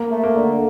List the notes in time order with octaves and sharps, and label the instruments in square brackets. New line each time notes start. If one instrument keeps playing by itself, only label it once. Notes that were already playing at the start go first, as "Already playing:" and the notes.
Already playing: [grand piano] A#3
[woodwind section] A3
[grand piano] A#3
[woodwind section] D3